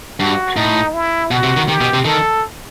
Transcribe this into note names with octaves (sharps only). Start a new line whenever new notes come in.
G2 F#4
A2 D#4
E4
B2 F#4
C3
D#3
D#3 G4
B2
C3
D#3 A4